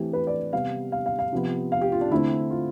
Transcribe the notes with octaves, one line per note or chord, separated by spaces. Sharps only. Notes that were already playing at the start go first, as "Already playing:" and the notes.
Already playing: E3 A3 C4 G4
B4
D5
C3 G3 B3 F5
F5
F5
F5
C3 F3 B3
F5
G4
F4
D4
D3 A3 C4 E4
F4